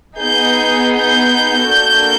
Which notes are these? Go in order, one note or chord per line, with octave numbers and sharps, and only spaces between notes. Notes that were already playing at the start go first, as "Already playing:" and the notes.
B3 D#4 G#4 G6
G6
A#3 D4 F#4 A4